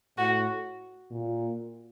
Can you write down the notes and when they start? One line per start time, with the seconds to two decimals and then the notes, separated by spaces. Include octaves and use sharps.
0.18 A2 F#4
1.11 A#2